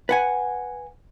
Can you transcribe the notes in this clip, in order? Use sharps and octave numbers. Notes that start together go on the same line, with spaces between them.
B4 F#5 G#5